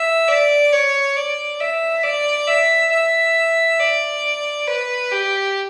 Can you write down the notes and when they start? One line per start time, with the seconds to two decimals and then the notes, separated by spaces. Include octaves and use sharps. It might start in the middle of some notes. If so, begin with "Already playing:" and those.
Already playing: E5
0.29 D5
0.73 C#5
1.16 D5
1.60 E5
2.04 D5
2.48 E5
2.92 E5
3.80 D5
4.67 B4
5.12 G4